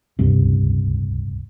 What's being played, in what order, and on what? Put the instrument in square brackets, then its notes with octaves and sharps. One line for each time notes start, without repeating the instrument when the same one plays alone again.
[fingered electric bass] D1 C#2 G2 C3